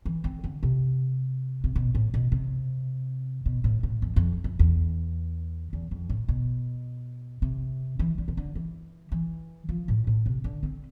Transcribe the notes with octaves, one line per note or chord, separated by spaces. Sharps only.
E3
C4
D3
C3
C3
B2
A2
B2
C3
B2
A2
A2
F2
F2
F2
E2
E2
F2
A2
B2
C3
E3
D3
C3
D3
E3
E3
F3
A2
A2
C3
D3
C4